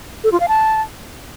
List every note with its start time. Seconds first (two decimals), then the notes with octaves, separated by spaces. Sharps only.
0.24 A4
0.32 F4
0.40 F5
0.48 A5